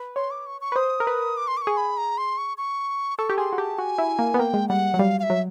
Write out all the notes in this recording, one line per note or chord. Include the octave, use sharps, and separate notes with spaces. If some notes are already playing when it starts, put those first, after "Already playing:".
Already playing: B4
C#5 C6
D6
C#6
C#6
B4
C5 D#6
A#4
B4
D6
C6
D6
C#6
G#4
B5
A#5
C6
C#6
C#6
A4 C#6
G4
G#4 C6
F#4
G4 A5
F#4 G#5
E4
A#3
B3
A#3 G5
G#3
G3 F#5
F#3
G3 F5
F5
E5
F#3